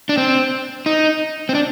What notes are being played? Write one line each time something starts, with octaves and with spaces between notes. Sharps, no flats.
D4
C4
D#4
C4
D4